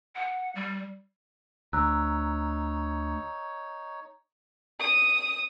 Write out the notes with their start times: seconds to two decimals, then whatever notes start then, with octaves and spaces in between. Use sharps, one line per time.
0.16 F#5
0.55 G3
1.73 D2 D#4 C#5 A#5 E6 F#6
4.80 D#6